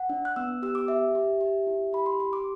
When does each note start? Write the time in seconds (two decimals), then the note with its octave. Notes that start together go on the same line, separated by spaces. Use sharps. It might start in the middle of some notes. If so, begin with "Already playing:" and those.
Already playing: F#5
0.09 D4
0.25 F#6
0.36 B3 E6
0.62 G4 E6
0.75 D6
0.88 G4 E5
1.15 G4
1.41 G4
1.67 E4
1.93 G4 B5
2.06 C6
2.20 G4 C6
2.33 D6